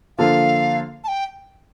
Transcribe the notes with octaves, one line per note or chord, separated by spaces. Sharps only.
D3 F3 A#3 F4 A4 F5
A5
G5